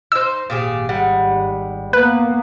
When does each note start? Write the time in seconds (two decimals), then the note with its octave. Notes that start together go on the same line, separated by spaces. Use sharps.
0.12 D#4 C5 E6
0.50 G#1 A#2 G4 G#4
0.89 G3 G#3 F#5
1.93 A#3 B3 B4